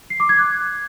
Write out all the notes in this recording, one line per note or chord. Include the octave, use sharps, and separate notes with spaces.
C7
D6
G#6
F#6